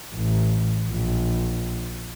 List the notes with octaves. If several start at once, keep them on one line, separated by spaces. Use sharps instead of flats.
A1
A#1